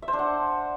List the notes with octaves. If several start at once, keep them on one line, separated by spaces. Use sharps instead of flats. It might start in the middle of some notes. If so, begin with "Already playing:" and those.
E5
C5
D4
F#5